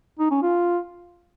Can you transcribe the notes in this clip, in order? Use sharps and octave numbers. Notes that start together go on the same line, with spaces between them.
D#4
C#4
F4